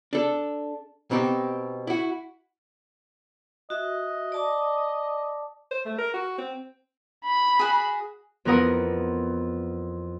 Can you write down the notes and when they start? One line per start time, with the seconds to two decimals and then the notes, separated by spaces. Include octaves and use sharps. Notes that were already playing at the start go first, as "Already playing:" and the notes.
0.13 D4 A4
1.11 B2 C4 D#4 G4
1.87 E4 F#4
3.70 F#4 D#5 E5
4.32 D5 A5 D6
5.71 C5
5.86 A3
5.99 A#4
6.14 F#4
6.38 C4
7.25 B5
7.59 F#4 G#4
8.45 F2 E3 B3 A#4 F#5 D#6